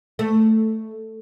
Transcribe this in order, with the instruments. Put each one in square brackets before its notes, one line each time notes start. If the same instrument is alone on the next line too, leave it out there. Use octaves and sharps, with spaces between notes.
[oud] A3